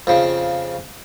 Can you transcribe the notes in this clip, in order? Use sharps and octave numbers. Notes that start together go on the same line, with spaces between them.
F2 C#3